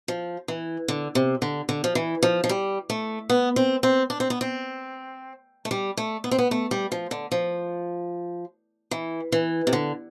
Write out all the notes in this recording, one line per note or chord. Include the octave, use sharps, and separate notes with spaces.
F3
E3
D3
C3
D3
D3
F3
E3
F3
F3
G3
A3
B3
C4
C4
D4
C4
B3
C4
A3
G3
A3
B3
C4
B3
A3
G3
F3
D3
F3
E3
E3
C3
D3